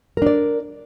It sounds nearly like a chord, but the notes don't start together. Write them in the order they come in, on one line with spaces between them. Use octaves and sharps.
A#4 D4 D5